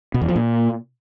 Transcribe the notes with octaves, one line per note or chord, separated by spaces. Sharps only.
B2
E2
F3
A#2